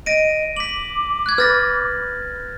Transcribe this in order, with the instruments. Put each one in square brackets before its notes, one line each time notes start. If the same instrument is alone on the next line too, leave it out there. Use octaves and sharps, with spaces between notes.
[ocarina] D#5 [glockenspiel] A#6 D7 D#7
[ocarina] D6 [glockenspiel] B6 F#7
[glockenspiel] F#6 G#6
[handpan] B4 [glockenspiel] F6 A6 A#6